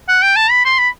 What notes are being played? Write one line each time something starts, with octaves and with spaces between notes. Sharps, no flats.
F#5
G5
A5
B5
C6
B5